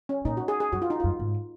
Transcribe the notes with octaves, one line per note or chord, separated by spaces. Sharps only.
C#4
A#2 D#4
F#4
G#4
G#4
F#2 F#4
F4
D#4
F#2 F4
G#2